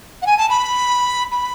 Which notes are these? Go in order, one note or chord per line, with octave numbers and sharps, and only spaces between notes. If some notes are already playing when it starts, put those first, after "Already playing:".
F#5
G#5
A5
B5
B5